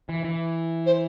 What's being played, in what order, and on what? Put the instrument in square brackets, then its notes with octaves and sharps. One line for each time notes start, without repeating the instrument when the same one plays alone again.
[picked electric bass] E3
E3
[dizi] C5